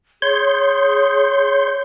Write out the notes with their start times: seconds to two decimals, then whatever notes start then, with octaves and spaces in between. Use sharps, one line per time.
0.22 G#4 C#5 C6 G6